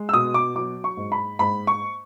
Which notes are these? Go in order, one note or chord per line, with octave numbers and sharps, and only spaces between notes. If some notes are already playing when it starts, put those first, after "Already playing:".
Already playing: G#3
E6
B2 D#6
D6
F#3 D6
C#6
G#2
B5
G#2 B5
C#6